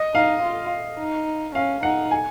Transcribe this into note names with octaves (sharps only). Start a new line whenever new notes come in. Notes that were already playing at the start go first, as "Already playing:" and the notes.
Already playing: D#5
D#4 F5
F4
D#4
C#4 F5
D#4 F#5
G#5